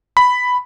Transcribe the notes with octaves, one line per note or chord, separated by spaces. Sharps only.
B5